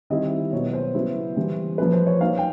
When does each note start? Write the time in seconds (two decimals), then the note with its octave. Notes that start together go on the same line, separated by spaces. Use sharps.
0.10 D#3 G3 C4 E4 D#5
0.53 B2 F#3 B3 C#5
0.73 C5
0.95 C#3 F#3 B3 E4
1.36 E3 G3 A#3
1.78 F3 A#3 C#4 B4
1.92 C5
2.07 C#5
2.21 F#3 A#3 D#4 F5
2.38 G5